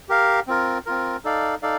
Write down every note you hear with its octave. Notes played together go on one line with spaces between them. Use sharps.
G4 A#4 F5
C4 F4 A#4
C4 F4 A#4
D#4 A4 D5 F5
D#4 A4 D5 F5